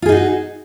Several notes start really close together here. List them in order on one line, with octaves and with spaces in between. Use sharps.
F4 G#4 D#4 F#4